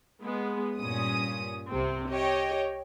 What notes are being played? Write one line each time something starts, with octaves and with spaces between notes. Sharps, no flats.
G#3 B3
G2 A#2 C#4 D#6
C2 C3 C4
G4 C#5 D#5 G5